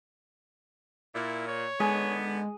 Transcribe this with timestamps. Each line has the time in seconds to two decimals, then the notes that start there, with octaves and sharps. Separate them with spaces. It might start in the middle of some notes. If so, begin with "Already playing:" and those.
1.15 A#2 E4
1.47 C#5
1.80 D3 D#3 G#3 B3 G#4